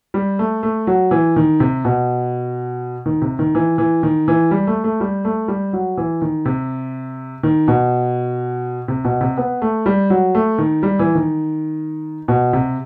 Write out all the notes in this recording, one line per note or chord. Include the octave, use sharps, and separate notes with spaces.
G3
A3
A3
F#3
E3
D#3
C3
B2
D#3
C3
D#3
E3
E3
D#3
E3
G3
A3
A3
G3
A3
G3
F#3
E3
D#3
C3
D#3
B2
C3
B2
C3
B3
A3
G3
F#3
A3
D#3
G3
E3
D#3
B2
C3